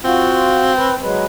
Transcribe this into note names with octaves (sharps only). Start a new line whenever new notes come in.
C4 F4 F#4
B4
F#3 G#3 B4